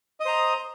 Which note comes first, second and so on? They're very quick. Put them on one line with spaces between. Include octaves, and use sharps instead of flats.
D#5 D#6 C5 A#5